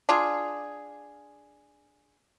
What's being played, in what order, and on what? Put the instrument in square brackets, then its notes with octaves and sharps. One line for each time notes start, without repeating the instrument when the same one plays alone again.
[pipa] D4 F4 G#4